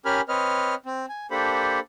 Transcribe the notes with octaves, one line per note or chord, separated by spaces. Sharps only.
C#4 G4 A#4 G#5 B5 F6
C4 B4 C#5 D#5 F6
C4
G#5
A#3 D4 G4 A4 C5 B5